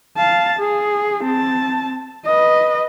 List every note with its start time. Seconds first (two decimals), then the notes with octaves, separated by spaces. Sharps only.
0.18 F5 A5
0.59 G#4
1.24 C4 A5
2.26 B4 D#5